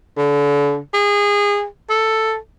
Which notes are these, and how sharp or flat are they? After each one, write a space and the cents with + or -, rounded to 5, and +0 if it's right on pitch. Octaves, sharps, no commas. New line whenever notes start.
D3 -35
G#4 -25
A4 +5